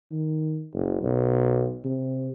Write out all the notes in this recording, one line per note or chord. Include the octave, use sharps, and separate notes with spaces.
D#3
F#1
B1
C3